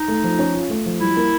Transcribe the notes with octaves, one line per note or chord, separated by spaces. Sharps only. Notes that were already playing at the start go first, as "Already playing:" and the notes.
Already playing: D#4
A3
F3
C#4
F4
A3
F3
G3 E4
A#3